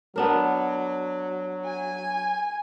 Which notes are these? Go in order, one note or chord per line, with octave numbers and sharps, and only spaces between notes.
F#3 B3 D4 A#4
G#5